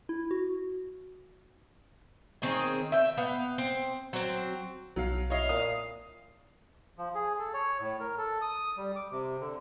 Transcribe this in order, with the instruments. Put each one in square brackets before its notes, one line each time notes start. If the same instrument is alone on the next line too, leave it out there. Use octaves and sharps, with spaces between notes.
[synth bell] E4
F#4
[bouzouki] D#3 C4 G#4 C#5
E5 G5
B3 F5 G5
C4
F#3 C4
[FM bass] B1 [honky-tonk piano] F#3 F5
[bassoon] E4 [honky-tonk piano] C#5 D#5 [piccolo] F5
[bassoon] A#2 [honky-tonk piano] D#6
[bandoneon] F3
G#4
A4
C#5
A2
A#4
A4
D#6
G3
D6
C3
D3